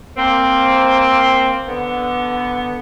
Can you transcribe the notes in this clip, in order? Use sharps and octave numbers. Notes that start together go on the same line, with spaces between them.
A#3 C4
D3 B3